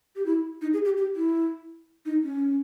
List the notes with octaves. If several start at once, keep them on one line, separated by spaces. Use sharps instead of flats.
G4
E4
D#4
G#4
G4
G4
E4
D#4
C#4